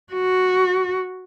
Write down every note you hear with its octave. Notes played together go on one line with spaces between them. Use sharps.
F#4